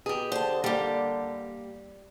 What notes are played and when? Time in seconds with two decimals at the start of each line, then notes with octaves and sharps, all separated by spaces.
0.06 B2 G4 G#4
0.32 D3 C5 A5
0.64 G3 A#3 G4